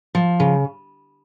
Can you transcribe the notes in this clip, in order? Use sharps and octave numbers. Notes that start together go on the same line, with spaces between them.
F3
C#3